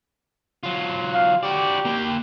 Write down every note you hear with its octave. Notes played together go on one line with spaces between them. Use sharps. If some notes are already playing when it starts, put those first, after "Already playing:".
F#3 F4
F5
F#4 G4 D5
A#3 G5